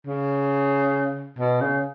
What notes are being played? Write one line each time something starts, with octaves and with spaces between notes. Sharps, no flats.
C#3
B2
C#3